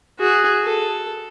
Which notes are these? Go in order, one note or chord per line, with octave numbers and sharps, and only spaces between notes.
F#4 G#4
A4